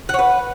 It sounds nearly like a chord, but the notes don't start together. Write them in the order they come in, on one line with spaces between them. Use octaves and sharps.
F#5 C#5 B4